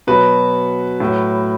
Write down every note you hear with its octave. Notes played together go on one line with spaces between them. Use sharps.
B2 F#3 F#4 B4
A2 F#3